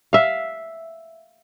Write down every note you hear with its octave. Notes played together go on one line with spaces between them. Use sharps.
E5 F5